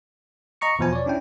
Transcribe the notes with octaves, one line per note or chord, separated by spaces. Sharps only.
D#5 A#5 C#6 C#7
E2 B2 F3 C5 G#5
C#5 D5
C#4 D4 E4 G5